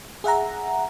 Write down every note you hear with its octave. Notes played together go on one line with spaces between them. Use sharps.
G#4 E5 F#5 A#5